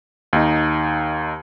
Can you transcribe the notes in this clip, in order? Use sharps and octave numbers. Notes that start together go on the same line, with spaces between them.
D#2 D#4